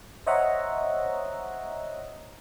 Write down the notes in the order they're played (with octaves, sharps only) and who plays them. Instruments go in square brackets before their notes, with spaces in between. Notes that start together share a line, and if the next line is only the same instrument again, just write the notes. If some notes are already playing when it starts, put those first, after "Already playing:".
[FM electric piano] C5 C#5 D#5 E5 F#5 A#5